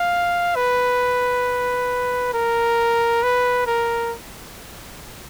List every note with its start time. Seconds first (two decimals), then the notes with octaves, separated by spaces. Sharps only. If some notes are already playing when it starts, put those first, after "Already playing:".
Already playing: F5
0.55 B4
2.34 A#4
3.23 B4
3.67 A#4